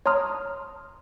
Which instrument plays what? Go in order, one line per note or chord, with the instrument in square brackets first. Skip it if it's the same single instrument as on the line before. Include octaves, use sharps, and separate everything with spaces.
[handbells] C#5 A5 A#5 C6 D#6 F6